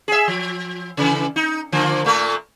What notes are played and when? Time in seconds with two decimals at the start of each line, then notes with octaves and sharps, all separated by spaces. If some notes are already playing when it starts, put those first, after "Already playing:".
0.08 G#4 E5
0.28 F3
0.97 C#3 E3
1.36 D#4
1.72 D3 F3 A#3
2.04 A#2 A3 A#3